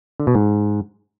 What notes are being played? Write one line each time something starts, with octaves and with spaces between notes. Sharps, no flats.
D3
B2
G#2